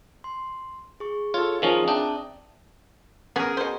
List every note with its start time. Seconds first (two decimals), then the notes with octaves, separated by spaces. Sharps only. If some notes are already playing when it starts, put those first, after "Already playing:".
0.24 C6
1.00 G#4 C#6
1.34 F4 A4 C#5
1.62 D#3 F3 C#4 F4 G#4 A#4 D#5 D#6
1.88 C4 D4 E5 G5 A5 A#5 D#6
3.36 B3 C#4 G#4 A#4
3.57 B2 C5